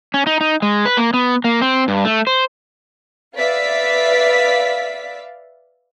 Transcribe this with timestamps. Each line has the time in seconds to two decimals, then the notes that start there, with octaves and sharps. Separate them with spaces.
0.14 C#4
0.27 D#4
0.41 D#4
0.62 G#3
0.85 B4
0.97 A#3
1.14 B3
1.44 A#3
1.62 C4
1.88 G2
2.05 A3
2.27 C5
3.37 B4 D5 E5 F5 B6